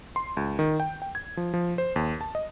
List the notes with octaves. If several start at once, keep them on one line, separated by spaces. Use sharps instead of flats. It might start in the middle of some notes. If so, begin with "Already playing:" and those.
C6
C#2
D#3
G5
G5
G#6
F3
F3
C5
D#2
A5
D#5